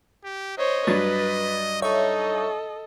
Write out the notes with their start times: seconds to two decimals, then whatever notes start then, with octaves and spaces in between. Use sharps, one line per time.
0.24 G4
0.58 C5 C#5 D#5
0.87 G2 F#3 D4 B4 A6
1.82 D#4 A4 C#5 D#5 E5 C#6